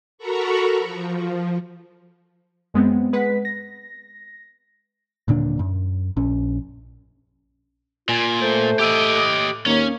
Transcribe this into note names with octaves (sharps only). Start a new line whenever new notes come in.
F#4 A4 A#4 A#5 B5 C#6
F3
F#2 G#3 B3 C4
G#3 B4 F#5 B6
A#6
D#1 A#2 D3 D4
F#2
A#1 C#4
A#2 F4 G#5
A3 C5
A2 G4 D#5 D6 E6
D#6 F6 F#6
D#2 A#3 C#4 C#5